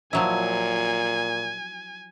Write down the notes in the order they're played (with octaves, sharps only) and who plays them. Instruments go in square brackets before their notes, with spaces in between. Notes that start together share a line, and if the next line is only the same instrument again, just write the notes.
[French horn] A#2 [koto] F3 F#3 E4 [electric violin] G#5